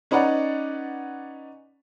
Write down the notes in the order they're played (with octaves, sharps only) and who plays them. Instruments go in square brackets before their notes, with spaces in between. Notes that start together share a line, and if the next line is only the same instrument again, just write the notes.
[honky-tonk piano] C#4 D#4 B4 D5 F#5